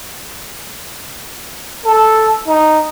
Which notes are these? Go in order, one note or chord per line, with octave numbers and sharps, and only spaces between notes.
A4
D#4